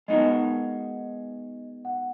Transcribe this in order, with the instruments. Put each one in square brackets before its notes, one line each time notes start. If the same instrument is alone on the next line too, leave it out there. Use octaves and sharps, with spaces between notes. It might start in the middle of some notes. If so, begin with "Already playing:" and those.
[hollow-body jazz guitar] G#3 B3 D#4 F#4 A#4 [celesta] D#5
[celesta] F#5